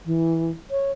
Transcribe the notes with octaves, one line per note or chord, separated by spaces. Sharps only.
E3
C#5